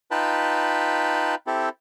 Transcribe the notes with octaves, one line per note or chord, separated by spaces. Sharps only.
D#4 F4 B4 G5 A5 B5
C4 E4 G4 A4